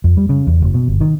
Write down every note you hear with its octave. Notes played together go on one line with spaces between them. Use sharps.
F2
G3
C#3
E2
F#1
B2
G1
D#3